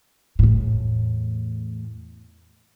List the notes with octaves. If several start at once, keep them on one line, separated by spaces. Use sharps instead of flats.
E2 A2